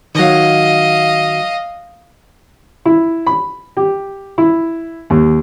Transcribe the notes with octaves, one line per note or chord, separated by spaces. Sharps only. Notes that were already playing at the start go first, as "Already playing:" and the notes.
D#3 F#3 D#5 F5
E4
B5
G4
E4
D#2